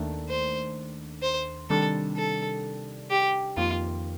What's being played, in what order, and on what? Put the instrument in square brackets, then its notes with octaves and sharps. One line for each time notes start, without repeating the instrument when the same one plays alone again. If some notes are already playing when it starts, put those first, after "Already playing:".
Already playing: [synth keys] D#2 D#3 A3 D4
[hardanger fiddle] C5
C5
[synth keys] C3 D#3 G3 D4 [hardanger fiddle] A4
[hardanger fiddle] A4
G4
[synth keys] F2 D#3 A#3 [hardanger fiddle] F4